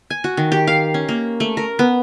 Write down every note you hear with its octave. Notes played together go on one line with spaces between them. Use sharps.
G#5
F#4
D#3
G4
F5
C#4
A#3
A3
A#4
B3